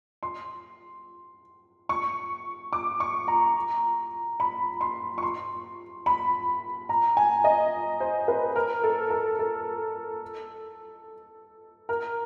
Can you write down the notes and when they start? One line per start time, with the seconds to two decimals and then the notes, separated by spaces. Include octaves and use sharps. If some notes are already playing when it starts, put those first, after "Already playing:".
0.23 C6
1.89 C#6
2.73 D6
3.00 C#6
3.28 A#5
4.40 B5
4.81 C6
5.18 C#6
5.23 C6
6.06 B5
6.89 A#5
7.17 G#5
7.44 D#5
8.00 C5
8.28 B4
8.56 A#4
8.84 A4
9.10 A#4
9.39 A4
11.89 A#4